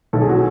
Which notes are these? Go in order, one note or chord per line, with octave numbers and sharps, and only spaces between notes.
B1 A4
G#4
F#4